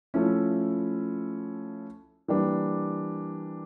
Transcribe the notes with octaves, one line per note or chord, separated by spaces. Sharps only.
F3 A3 C#4 E4
E3 G3 A#3 D4